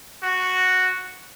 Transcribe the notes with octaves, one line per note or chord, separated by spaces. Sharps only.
F#4